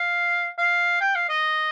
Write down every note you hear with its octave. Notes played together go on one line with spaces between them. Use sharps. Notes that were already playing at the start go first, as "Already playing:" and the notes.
Already playing: F5
F5
G5
F5
D#5